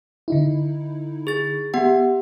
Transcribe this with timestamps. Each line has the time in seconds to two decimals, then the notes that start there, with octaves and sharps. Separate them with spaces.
0.28 D3 D#4 E4
1.27 G#4 A6
1.74 B3 G4 F#5